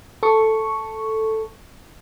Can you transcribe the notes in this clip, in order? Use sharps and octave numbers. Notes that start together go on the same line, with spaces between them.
A4 C#6